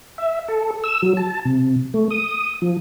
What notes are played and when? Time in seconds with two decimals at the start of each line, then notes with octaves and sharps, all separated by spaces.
0.18 E5
0.48 A4
0.84 E6
1.02 F#3
1.17 A5
1.45 C3
1.94 A3
2.10 D#6
2.62 F3